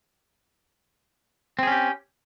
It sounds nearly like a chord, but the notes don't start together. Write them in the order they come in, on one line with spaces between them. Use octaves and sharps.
C4 G#4 C#4 G4